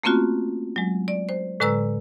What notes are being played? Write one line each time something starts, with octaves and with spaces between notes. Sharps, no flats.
A3 A#3 C4 C#4 F4 F#4
F#3 G#3
D5
C5
A2 D3 G#3 B4 A#5 E6